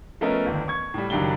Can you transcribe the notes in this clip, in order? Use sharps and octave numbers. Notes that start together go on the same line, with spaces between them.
F3 A3 B3 C#4 A#4 D#5
G1 D#2
C#6 G#6
A2 G3
F#1 D#3 F#3 G3 D4 G7